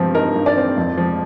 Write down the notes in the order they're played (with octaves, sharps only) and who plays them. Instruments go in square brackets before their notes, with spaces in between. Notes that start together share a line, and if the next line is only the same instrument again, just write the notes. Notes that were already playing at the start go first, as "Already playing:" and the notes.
Already playing: [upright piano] G2 F3 C4
D#4 A#4
G2
D5
C4
F2
F3